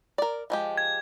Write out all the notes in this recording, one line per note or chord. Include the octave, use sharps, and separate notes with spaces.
A#4 D5
F3 G#3 G4
G#6